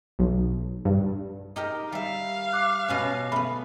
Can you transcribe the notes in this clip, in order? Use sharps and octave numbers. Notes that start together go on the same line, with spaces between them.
B1
G2
D#4 G4 A#4
G3 E5 F5
D6 F#6
B2 B3 C#4
A3 B3 B5